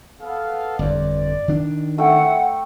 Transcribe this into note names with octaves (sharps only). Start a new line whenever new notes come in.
B3 A4 F5
G1 F2 D5
D#3 D4
A3 C4 E4 E5 F#5 G5